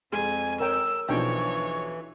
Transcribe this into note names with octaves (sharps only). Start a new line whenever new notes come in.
F2 G#3 G#5 C6
A#4 C#5 G5 E6
B1 E3 F3 D4 D#4 C#5 G5